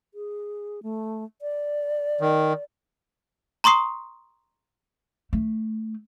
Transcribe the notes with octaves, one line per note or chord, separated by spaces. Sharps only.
G#4
A3
D5
D#3
A#5 C6 C#6 D#6 C7
A3